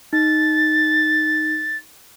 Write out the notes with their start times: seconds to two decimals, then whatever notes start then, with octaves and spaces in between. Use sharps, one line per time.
0.13 D#4 A6